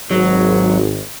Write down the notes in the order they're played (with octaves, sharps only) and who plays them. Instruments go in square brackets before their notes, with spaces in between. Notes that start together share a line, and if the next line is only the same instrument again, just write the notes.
[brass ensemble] G#1 [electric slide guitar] F#3